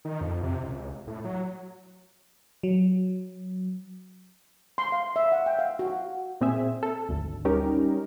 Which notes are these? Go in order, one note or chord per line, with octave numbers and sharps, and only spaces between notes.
D#3
F2
C3
C#2
A2
F#3
F#3
C6
F5
E5
F#5
G5
F5
F#4
A#2 C4 G#4 E5
A4
G#1 D2
G3 C#4 D#4 G4 A#4